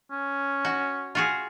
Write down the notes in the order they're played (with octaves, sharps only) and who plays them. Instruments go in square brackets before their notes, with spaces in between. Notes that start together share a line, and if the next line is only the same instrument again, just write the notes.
[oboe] C#4
[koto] F#4
F4 F#4 G#4